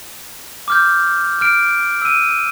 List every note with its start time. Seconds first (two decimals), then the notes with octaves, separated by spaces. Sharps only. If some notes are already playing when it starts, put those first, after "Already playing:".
0.68 D6 F6 G6
1.41 F6 D7
2.02 E6 D#7